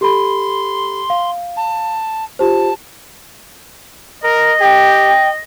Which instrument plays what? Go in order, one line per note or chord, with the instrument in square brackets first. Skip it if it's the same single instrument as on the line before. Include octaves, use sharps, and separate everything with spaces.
[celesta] G4 A4 B5 [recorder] C6
[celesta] F5
[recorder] A5
[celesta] F4 G4 C5 [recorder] A5
[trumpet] A#4 [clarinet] D#5
[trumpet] G4 [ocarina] G5